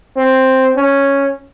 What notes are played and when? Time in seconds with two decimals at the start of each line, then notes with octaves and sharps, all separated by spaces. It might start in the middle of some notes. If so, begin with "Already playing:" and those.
0.16 C4
0.76 C#4